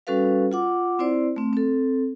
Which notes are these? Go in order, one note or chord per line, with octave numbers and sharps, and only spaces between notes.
G3 C#4 F#4 A4 B4 F5
F4 F#5 D6
C4 E4 C5 D5
A3 C4
C4 A4